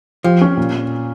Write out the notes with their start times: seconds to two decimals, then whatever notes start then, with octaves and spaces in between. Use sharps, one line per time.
0.24 F3 G4
0.41 C#4
0.57 A#2